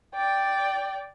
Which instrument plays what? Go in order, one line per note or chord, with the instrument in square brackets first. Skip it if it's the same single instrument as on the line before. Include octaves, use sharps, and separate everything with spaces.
[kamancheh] D5 G5